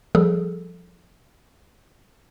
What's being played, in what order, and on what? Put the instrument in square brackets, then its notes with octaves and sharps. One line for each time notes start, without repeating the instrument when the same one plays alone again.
[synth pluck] F3 G3 G#4 A4